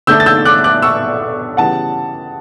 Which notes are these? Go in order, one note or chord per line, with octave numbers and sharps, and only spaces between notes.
D3 A3 D4 E6 G6
A6
E6 G6
D6 F#6
D6 F#6
C#6 E6
C#3 E3 G3 B3 F#5 A5